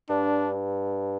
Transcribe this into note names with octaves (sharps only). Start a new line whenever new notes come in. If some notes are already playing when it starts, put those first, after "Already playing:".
G2 D4